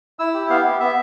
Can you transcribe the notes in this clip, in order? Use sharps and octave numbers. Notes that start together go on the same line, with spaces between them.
E4 E6
G4
B3 F5
B3
B3 E5